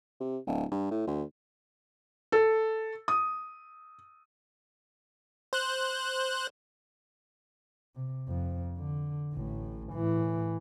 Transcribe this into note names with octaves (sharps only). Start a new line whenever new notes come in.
C3
D1
G2
A2
D2
A4
D#6
C5 F#6
C3
F2
D3
A1 A2
A2 E3